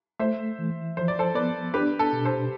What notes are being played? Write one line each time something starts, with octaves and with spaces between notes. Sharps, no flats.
A3 C5 E5
E3
F3 C5
D5
A4 C5
B3 B4 D5
D4 G4 B4
A4
B2
A4 C5